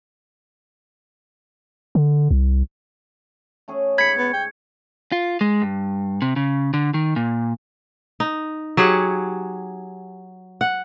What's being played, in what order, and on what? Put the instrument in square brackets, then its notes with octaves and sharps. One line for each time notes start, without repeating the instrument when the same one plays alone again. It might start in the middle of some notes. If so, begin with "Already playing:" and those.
[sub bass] D3
C2
[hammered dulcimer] A3 C#4 G#4
[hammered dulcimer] G#2 [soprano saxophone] B5 [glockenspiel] G#6 C#7
[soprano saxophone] B3
G5
[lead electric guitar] F4
G#3
G2
C3
C#3
D3
D#3
A#2
[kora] D#4
F#3 G4 G#4 F#5
F#5